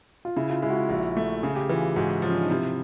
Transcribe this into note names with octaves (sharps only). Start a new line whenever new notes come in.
F4
C#3 E4
F4
G#3 E4
F#4
F4
A#1 F#4
A3
C#3 G#4
G4
E3 F4
G4
G#2 F#4
F3 C#4
D4
D#4
C3 E4